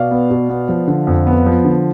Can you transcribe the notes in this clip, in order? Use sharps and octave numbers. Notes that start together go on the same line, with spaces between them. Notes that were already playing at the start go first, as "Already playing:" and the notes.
Already playing: B2 D5 F5
B3
B2
B3
F3
D3
F2
B3
F3
D3